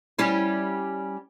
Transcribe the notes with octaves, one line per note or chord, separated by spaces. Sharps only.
G3 C#4 E4